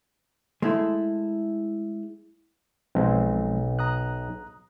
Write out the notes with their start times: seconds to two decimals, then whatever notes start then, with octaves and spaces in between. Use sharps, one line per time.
0.62 G#3 A3 E4
2.95 B1 F3 G#3 C4
3.79 A#5 D#6 F#6